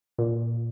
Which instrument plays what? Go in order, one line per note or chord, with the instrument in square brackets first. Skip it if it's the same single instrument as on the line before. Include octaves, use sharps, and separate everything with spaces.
[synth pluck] A#2